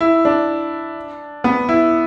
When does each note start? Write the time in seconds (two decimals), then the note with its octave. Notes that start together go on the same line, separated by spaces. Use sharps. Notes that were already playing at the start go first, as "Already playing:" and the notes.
0.01 E4
0.25 D4
1.44 B3
1.69 E4